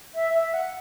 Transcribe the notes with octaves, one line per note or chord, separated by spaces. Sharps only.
E5
E5
F#5